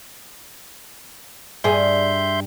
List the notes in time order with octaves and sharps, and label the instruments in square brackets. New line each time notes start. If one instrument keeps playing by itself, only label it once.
[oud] G2 G#4 [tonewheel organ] E5 C6 G6